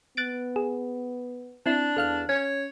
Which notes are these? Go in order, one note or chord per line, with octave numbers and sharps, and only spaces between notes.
B3 F#6 A6 D7
G#4
C4 D4 E4
E2 A4 F5 F6
C#4 C#5